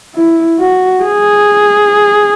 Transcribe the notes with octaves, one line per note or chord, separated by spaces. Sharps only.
E4
F#4
G#4